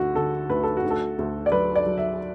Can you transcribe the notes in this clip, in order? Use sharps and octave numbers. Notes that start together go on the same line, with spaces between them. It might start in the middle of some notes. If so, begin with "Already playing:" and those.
Already playing: D2 D3 F#4
D3 A4
D2 B4
A4
F#4
D2
A4
D2
D5
F#3 B4
D5
F#3
E5